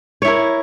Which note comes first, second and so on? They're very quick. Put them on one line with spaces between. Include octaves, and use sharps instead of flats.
C#5 E4 A#4